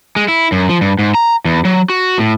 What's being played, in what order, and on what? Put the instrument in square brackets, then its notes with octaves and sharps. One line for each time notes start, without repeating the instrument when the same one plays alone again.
[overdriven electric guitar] G#3
E4
F#2
F3
G2
G#2
A#5
E2
F#3
F#4
A2